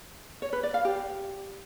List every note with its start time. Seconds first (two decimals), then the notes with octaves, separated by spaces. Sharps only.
0.42 C#5
0.53 B4
0.63 D5
0.74 F5
0.85 G4